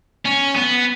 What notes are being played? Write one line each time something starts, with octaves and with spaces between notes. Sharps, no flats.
C#4
B3